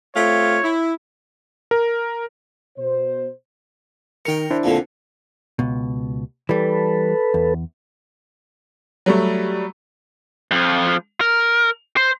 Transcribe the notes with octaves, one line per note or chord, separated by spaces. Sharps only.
A3 C4 F4 C#5
E4
A#4
B2 C5
D#3 A#4 G5 C#7
D4 E4 C5
F2 A#2 D3
C#2 B2
E3 G3 A4 B4
E2
F#3 G3 A3
F2 F3
A#4
C5